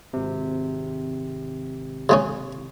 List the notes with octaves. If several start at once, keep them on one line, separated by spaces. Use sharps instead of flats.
G#1 C3
C#3 G#3 C#4